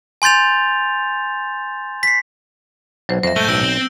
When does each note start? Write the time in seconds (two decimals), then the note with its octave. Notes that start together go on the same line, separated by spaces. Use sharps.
0.22 G#5 C6 G6 A6 F7
2.03 B6 C7
3.09 B1 F#3 C5
3.23 F2 C5 E5 A#6
3.36 A2 G#3 A3 G6 G7
3.49 B1 E6 D7
3.64 C4